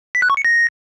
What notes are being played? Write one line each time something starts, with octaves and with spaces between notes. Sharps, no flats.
B6
F#6
C#6
C#7
A#6